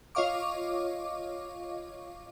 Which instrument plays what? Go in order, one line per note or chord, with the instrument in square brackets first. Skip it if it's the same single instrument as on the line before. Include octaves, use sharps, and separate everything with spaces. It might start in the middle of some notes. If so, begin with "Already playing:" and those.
[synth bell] F4 C#5 D#5 F5 C#6 D6